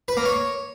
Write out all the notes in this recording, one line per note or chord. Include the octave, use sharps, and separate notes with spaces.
B4
A#3
C#5